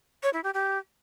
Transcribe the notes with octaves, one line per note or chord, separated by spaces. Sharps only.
C#5
E4
G4
G4